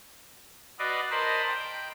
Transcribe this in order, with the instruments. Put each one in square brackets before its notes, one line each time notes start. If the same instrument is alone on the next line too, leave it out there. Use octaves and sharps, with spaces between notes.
[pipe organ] F#4 B4 D5 D#5 F5
A#4 C5 D#5 A5 B5 C6
G5